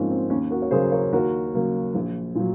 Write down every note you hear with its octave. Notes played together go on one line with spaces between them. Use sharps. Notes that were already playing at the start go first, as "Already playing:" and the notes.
Already playing: G#2 F3 A#3 C4 C#4
C4
D#2 C#4
F#4 A#4
C#5
C#3 F#3 A#3 G#4 C5
A#4 C#5
D#2 F#4 A#4
C#3 F#3 A#3
A#1
A#2 F#3